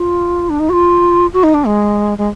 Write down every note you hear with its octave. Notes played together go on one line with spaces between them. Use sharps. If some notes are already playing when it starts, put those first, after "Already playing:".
Already playing: F4
D4
D#4
F#4
F4
F#4
D#4
D4
G#3
G#3